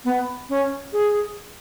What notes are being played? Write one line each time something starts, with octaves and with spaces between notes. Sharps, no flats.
B3
C#4
G#4